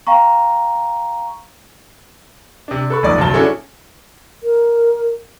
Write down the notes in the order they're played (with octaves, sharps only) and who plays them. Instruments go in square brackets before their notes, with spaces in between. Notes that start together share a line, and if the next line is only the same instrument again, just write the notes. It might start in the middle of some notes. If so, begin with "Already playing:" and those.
[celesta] F5 G5 A#5 C#6
[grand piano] C3 D4
A4 B4 B5 C#6
F#1 F2 G#2 D5 D#6 A6
G1 C2 G2 F#3 A5 G7
C#4 D4 E4 F#4 G#4 A4
[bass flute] A#4